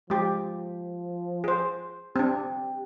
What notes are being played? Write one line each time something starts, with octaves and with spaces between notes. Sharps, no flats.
F3 G#3 G4
G#4 C5
C4 D4 G4